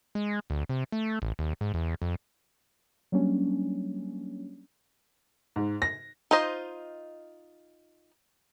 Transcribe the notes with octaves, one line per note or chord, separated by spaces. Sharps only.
G#3
D2
C3
A3
A1
D#2
G#2
E2
F2
F#3 G3 A#3 C#4 D4
G#2
A#6
D#4 F4 C5 D#5